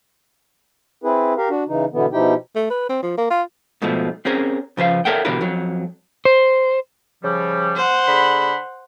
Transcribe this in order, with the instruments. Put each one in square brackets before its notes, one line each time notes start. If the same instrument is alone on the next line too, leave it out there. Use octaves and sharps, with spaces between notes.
[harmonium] C4 E4 G#4 B4
G4 A#4 F5
D4 F#4
C#3 E3 D#4
B2 D3 E3 B3
B2 F3 D#4 E4 G4 G5
[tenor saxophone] A3
B4
C4
F3
A#3
F4
[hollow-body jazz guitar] G#2 B2 F3 A3
C4 C#4 G#4 A#4
C#3 F3 B4 F5
A4 A#4 C#5 E5 F#5 G5
B2 D3 E3 G4 A#4 B4
F2 F#3
[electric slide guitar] C5
[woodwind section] C#3 F3 G3
[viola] C5 F#5
[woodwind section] D3 G#4 B5